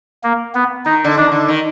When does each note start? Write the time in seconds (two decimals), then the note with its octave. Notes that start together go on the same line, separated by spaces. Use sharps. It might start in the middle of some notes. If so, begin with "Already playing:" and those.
0.24 A#3
0.55 B3
0.85 D#3 D#4
1.04 D3
1.17 D#3 D4
1.32 D3
1.48 D#3